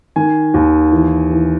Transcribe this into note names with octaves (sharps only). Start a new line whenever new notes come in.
D#3 G#5
D#2
E3
E3